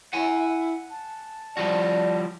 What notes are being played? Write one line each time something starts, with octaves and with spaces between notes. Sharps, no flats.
E4 F#5 G#5
A5
F3 G3 F#4 D5